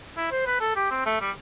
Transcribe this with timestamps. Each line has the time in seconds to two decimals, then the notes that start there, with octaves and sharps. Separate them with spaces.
0.17 E4
0.32 C5
0.47 B4
0.61 A4
0.76 G4
0.91 C4
1.06 A3
1.21 G3